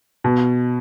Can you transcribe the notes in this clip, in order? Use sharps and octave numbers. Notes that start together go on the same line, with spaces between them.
B2